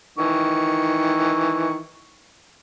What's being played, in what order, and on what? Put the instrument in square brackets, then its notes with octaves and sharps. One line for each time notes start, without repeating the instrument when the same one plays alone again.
[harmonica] D#3 E3 C#6